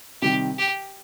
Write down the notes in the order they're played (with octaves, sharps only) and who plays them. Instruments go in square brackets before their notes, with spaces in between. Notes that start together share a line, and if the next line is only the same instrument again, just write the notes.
[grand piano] C3 D#3 G3 [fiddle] G4
[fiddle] G4